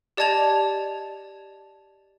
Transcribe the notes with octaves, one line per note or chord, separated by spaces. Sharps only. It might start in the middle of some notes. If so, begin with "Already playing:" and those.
G4 D5 D#5 A5 G#6 F7